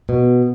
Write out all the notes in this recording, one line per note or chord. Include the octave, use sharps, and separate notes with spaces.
B2